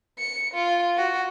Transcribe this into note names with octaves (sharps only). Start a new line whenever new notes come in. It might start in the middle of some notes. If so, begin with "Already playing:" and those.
C#7
F4
F#4